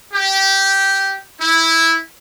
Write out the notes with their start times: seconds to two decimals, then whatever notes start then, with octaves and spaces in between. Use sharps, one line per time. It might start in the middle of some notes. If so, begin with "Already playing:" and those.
0.14 G4
1.40 E4